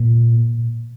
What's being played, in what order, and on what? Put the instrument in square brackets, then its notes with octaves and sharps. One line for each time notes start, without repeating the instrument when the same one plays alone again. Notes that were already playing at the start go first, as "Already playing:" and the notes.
Already playing: [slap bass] A#2